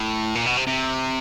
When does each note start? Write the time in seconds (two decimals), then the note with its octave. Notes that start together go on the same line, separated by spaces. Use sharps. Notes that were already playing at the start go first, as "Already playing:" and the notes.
Already playing: A2
0.35 A#2
0.46 B2
0.57 C3
0.67 C3